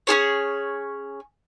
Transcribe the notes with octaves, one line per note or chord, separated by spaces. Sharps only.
C#4 D4 G#4 C#5